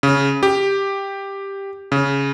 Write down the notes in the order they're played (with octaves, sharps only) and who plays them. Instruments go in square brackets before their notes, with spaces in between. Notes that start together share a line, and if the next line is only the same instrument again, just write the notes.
[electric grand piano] C#3
G4
C#3